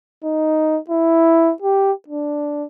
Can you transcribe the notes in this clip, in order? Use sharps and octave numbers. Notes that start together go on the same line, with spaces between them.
D#4
E4
G4
D4